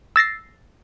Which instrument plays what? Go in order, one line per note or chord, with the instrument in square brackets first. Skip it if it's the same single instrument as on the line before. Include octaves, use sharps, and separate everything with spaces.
[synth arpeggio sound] E6 A6 A#6 C7